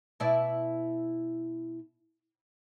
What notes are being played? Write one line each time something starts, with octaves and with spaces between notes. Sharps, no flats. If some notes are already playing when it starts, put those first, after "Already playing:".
B2 E4 D5